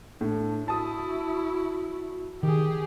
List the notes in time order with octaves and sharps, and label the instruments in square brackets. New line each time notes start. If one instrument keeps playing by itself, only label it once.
[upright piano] A2 [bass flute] D4
[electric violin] E4 [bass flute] F#4 [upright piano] A5 D#6
[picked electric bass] D#3 [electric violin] G4 G#4